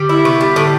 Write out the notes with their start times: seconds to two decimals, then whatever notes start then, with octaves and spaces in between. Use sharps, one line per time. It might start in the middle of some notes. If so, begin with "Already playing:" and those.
Already playing: D3 G3
0.09 E4
0.25 C3 B3
0.41 G3
0.56 A2 D3